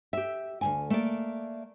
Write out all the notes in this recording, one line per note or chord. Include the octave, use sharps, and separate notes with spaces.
G4 E5
D2 G#2 G#5
A3 A#3 D5